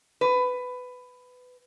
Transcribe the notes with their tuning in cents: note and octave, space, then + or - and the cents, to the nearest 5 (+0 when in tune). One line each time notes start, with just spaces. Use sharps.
B4 +15